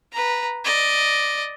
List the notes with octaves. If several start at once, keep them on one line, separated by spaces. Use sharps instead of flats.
B4 A#5
D5 D#5